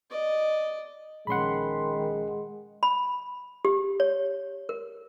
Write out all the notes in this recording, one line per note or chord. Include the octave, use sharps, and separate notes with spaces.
D5 D#5
A#1 D#3 G#3 C#4 F#5 B5 C6
B5
G4
C#5
A#4